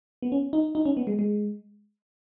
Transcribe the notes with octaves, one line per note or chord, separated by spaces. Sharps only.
B3
C#4
D#4
D#4
C#4
B3
G#3
G#3